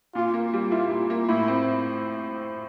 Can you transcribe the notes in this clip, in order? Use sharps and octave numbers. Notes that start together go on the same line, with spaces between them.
A#2 F4
A#3
G3
E4 F4
A#2
A#3
A2 E4
C4